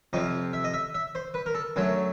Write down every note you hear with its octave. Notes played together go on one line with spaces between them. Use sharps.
F2 C3 F3 D#5
E5
D#5
E5
E5
C5
B4
A#4
A4
F#2 D3 F#3 A3